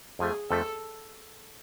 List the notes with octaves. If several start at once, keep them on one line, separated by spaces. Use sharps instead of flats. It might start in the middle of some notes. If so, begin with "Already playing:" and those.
F2 F3 A3 G#4
F2 F3 A3 A4